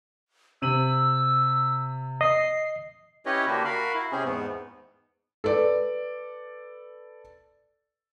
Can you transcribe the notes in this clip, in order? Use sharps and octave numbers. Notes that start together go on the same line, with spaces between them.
C3 E6 D#7 F#7
D#5 C7
C#4 E4 G4 B4 C#5 D#5
D3 A#3 F#4 G4
F#4 A#4 F5 B5
E4
C3 C4 C#4 G#4
E2 G#2 B3
A4 B4 D5